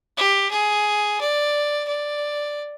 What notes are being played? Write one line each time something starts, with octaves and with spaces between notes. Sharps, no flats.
G4
G#4
D5
D5